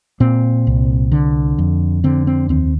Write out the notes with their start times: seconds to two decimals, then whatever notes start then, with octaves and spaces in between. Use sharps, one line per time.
0.20 A#2 C4
0.67 C2
1.12 D3
1.58 F2
2.04 D3 C4
2.27 C4
2.49 D#2 C4